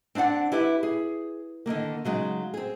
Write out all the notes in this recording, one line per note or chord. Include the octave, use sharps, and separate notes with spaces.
C4 D4 E4 D5 F#5
E4 G4 B4 E5
G#4
D3 D#3 F#3 A#3
C#3 F#3 G#3 D#4
C4 G#4